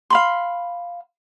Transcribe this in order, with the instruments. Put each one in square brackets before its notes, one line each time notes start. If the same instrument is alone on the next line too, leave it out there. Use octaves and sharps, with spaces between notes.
[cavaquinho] F5 B5 C6